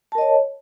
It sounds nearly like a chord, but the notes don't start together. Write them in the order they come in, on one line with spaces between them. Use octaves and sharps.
A5 A#4 D#5 C#5